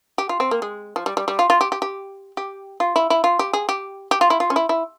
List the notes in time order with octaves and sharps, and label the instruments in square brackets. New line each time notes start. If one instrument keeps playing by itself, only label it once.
[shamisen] G4
F4
C4
A#3
G#3
F3
G3
G3
G3
F4
F4
G4
G4
G4
G4
F4
E4
E4
F4
G4
G#4
G4
G4
F4
E4
F4
C#4
E4
E4